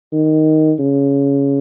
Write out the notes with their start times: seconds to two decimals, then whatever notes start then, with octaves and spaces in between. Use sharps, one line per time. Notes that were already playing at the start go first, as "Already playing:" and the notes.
0.13 D#3
0.79 C#3